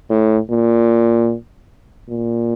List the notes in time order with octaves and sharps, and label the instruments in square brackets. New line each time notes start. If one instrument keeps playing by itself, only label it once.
[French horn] A2
A#2
A#2